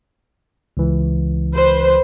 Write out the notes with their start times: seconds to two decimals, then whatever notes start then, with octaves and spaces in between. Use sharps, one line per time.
0.77 C#2 E3
1.53 B4 C5